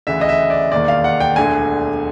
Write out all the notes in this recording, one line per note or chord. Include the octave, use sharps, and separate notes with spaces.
D2 C#3 E3 E5
D#5
E5
D5
E1 D#2 D#3 D5
F5
F#5
G5
E1 D2 D3 G#5